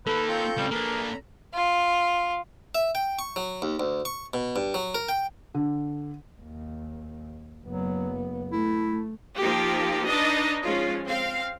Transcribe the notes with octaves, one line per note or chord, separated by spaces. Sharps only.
A#3 D#4 A4 B4
C4 F4 C#6 G6
C#2 G3 C4
A#3 D4 G#4 A#4 B4
A#5 B5
F4
E5
G5
C#6
F#3
D#2
D2
C#6
B2
G2
F#3
A#4
G5
D3
D#2
F#1 F#3 B3
A3 E4
F3 A#3 D#4 G4
D4 D#4 B4 D#5
F3 G#3 C#4 F4
C4 F5